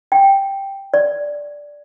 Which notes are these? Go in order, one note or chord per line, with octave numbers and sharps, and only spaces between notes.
G5
D5